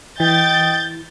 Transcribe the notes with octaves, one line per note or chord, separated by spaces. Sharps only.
E3 D#5 G5 G6 A6